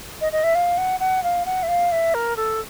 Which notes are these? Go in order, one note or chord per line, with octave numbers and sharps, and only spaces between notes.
D#5
D#5
E5
F5
F#5
F#5
F5
F#5
E5
F5
E5
A#4
A4